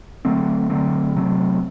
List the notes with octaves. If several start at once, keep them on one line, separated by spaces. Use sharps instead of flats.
D3 F#3 A3 C4
D3 F#3 A3 C4
C3 F#3 A3 C4